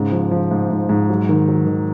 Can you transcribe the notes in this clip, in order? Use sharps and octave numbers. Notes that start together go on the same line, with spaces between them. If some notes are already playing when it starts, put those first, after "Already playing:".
Already playing: G#2 C#3
F3
F3
G#2
G#2
G#2
F#3
D#3
F#3
D#3